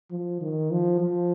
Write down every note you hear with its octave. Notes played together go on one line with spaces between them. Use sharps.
F3
D#3
F3
F3